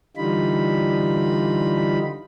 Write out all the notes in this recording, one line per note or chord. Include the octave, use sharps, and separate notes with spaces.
D3 E3 G3 D#4 F4 B5